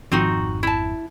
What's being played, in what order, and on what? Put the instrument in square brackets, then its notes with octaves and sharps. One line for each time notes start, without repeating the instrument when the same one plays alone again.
[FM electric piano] G#1 F2 [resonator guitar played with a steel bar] C4 D#4 F#4
[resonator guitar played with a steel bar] E4 A5